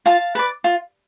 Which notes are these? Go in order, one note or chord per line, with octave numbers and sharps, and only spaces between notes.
F4 F5 A5
B4 D5
F4